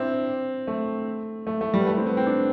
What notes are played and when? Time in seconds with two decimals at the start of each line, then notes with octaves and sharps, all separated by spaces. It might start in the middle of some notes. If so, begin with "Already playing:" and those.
Already playing: C4 D4 E4
0.67 A3
1.47 A3
1.61 A3
1.74 G3
1.80 B3
1.87 A3
1.97 C4
2.06 B3
2.17 C4
2.26 D4